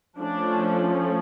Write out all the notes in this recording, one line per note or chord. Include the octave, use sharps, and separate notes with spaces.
F3 A3 C#4 D4